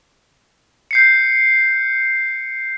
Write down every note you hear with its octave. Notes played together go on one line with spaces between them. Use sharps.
G6 C7 C#7